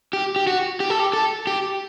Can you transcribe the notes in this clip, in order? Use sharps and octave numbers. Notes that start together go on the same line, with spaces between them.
G4
G4
F#4
G4
A4
G4
A4
G4